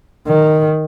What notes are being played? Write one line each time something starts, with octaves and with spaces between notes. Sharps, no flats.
D#3